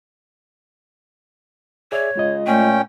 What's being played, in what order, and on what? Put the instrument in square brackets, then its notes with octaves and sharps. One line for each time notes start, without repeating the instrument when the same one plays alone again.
[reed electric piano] G#4 D5 E5 [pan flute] C#5
[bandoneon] C#3 [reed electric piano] G#3 F4 D#5
[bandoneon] A#2 C#4 G5 [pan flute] A3